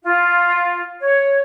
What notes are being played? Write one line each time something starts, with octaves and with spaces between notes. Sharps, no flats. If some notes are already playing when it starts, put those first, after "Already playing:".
F4
C#5